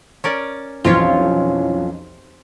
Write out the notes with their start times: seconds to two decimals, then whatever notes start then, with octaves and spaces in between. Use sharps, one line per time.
0.24 C#4 A#4 D5
0.84 B1 F2 E3 C4 C#4 F4 G4 C#5